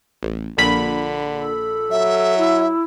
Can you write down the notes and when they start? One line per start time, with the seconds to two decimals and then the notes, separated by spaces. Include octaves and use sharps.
0.23 A1
0.58 A#1 A#2 D3 B5
1.38 A4
1.91 F#3 E5
2.38 E4